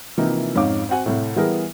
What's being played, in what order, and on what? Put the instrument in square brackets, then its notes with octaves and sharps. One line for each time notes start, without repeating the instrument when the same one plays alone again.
[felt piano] C3 E3 F3 A#3 D#4
F2 G#2 C#4 D#4 F5 D6
C4 F#4 F#5 G#5
C2 A2
E3 G3 B3 E4 G#4 A#4